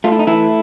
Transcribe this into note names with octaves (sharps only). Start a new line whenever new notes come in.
A3 F4
E4
D#4
E3 A3 E4